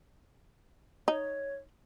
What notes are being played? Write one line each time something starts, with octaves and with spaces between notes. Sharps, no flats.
D#4 C#5